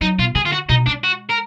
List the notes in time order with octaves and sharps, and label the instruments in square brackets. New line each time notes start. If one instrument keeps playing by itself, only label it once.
[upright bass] F#3 [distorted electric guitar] D#4
[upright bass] B2 [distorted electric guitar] F4
[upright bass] D3 [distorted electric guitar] G#4
[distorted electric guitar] F4
F#4
[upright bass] B2 [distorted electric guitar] D#4
[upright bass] G#3 [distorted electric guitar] D4
[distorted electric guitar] F#4
A#4